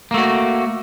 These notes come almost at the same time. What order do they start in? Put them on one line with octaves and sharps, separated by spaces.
A#3 A3 F#4